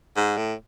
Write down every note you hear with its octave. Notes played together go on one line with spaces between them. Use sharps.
G#2
A2